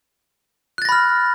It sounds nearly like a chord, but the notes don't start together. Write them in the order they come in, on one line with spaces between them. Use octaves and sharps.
F#6 A6 A#6 B5 F6